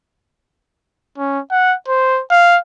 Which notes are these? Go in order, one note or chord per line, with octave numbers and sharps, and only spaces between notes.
C#4
F#5
C5
F5